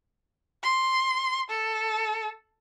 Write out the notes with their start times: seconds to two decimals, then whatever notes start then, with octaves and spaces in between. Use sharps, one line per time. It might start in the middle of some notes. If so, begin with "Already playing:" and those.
0.63 C6
1.50 A4